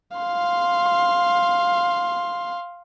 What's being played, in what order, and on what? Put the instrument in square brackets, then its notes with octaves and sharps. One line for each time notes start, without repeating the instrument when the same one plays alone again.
[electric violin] F5 C6